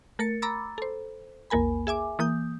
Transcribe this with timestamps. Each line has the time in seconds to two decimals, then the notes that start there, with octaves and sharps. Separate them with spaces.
0.19 A3 A#4 A6 C#7
0.42 A#5 B5 D6 E6 A6
0.78 A4 C5
1.50 A#1 E2 A#3 A#4 G#5 B5
1.87 G#4 E5 G#5 D6
2.19 E3 A#3 D#6 G6